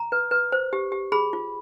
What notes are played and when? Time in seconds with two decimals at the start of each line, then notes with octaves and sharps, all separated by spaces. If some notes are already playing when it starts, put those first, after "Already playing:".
Already playing: A#5
0.12 B4
0.31 B4
0.52 C5
0.73 G4
0.92 G4
1.12 G#4 B5
1.33 F4